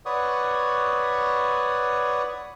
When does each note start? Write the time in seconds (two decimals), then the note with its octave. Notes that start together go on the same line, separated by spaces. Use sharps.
0.06 B4 C#5 D5 F#5 C#6 D#6